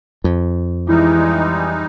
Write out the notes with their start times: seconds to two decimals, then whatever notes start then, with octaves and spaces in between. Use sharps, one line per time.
0.24 F2
0.88 E3 G3 G#3 D#4 E4